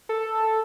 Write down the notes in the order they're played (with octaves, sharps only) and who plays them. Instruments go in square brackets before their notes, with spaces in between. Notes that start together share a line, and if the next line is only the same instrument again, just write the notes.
[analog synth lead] A4